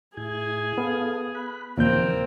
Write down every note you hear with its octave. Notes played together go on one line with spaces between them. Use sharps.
A2 E4 G#4 G#6
B3 A4 F5
B5 F#6
D#2 A#2 C#3 E3 F3 A#3 C4 G6